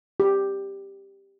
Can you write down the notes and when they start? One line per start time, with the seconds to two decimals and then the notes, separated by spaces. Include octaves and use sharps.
0.20 G4